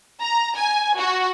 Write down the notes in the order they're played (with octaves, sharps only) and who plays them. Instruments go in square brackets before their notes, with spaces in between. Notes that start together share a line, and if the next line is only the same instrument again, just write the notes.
[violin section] A#5
G#5
F#4